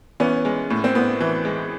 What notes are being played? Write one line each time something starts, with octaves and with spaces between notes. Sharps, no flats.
E3 B3 C#4
G#3
A2
C4
A2 B3
E3
G#3